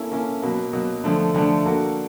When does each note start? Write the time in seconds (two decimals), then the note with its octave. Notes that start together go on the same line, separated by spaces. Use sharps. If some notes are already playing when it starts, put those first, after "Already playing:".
Already playing: A#3 C#4 E4 A4
0.11 A#3 C#4 E4 A4
0.42 B2 F#3 A#3
0.73 B2 F#3 A#3
1.04 D3 F3 A3 D4
1.34 D3 F3 A3 D4
1.65 A#3 D4 F#4 A4